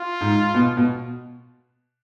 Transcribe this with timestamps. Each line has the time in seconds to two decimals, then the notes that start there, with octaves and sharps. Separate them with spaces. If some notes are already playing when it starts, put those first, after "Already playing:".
Already playing: F4
0.21 G#2
0.55 B2
0.77 B2